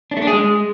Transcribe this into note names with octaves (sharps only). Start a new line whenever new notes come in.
D4
A3
D4
G#4
G#3